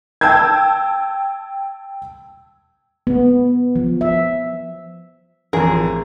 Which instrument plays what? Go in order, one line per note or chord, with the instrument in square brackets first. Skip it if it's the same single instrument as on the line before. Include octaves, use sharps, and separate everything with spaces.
[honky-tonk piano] G5 A5 E6 G6 G#6
[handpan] B3
F3
E5
[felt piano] A1 F2 [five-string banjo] G#4 A#4